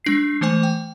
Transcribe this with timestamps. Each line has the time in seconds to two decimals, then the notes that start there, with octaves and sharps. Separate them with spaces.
0.05 G#3 D4 C7
0.41 E3 A3 C5 G#5
0.63 G5